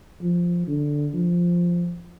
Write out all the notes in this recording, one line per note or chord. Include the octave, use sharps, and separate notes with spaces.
F3
D3
F3